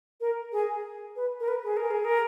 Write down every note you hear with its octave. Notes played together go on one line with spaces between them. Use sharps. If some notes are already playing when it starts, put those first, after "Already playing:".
A#4
G#4
B4
A#4
B4
G#4
A#4
G#4
A#4